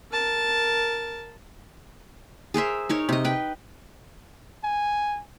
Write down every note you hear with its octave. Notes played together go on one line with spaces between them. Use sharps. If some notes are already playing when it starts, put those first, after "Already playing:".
A#4 A5
G#4 A#4 C5 E5
D#4 A#4 C#5
C3 D#5
B4 G5
G#5